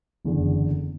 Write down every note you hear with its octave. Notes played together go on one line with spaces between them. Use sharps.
F#1 E2 D3